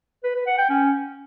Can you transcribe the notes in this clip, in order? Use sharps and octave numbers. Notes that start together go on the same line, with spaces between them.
B4
B4
F#5
G5
C#4